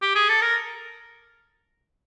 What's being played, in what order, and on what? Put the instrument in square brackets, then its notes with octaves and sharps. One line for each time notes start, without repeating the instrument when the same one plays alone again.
[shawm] G4
G#4
A4
A#4